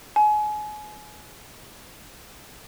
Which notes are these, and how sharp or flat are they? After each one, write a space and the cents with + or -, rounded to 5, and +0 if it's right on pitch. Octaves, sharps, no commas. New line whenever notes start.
G#5 +30